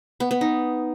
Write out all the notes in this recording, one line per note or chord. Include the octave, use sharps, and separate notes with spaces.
B3
B3
D#4